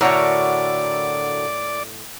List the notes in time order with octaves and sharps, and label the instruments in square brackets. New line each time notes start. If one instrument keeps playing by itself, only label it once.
[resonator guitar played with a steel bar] A2 C#5 [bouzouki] D3 F#4 A#4 [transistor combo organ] D5